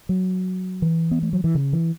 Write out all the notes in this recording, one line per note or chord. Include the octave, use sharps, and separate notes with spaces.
F#3
E3
B3
A3
F#3
E3
C#3
E3